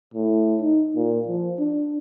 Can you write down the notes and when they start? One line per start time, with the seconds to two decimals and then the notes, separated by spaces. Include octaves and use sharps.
0.14 A2
0.61 D#4
0.95 A#2
1.27 F3
1.58 D4